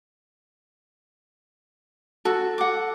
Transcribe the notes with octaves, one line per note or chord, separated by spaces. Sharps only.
F#4 A4
F#5 D6